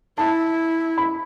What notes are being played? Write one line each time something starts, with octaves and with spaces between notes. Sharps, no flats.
E4 A5
B5